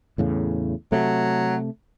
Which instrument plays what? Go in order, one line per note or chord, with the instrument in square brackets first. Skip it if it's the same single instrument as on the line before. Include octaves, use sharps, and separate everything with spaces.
[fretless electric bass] E2 A2 C#3
[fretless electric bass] C3 A3 [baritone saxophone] F#3